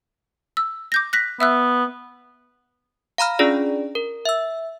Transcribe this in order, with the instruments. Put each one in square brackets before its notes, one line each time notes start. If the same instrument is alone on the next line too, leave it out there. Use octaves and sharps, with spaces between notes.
[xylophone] E6
D6 G6 A#6
F#6 A#6 B6
[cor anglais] B3 [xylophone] E5 E6 F#6
[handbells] F5 A#5 B5 F6
C#4 D4 F4 G#4 D5
A#4
E5 E6